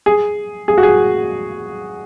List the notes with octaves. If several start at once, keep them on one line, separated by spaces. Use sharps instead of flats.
G#4
G#4
F#4
G#4